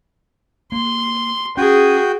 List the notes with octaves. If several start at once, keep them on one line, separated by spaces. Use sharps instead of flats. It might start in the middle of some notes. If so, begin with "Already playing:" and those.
A#3 C6
C#4 F#4 G#4 G5